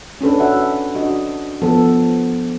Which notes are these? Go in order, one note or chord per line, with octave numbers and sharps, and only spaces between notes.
C#4 D4 A4 B4
F#4 E5 F#5
D4 F#4 D#5
F3 B3 A4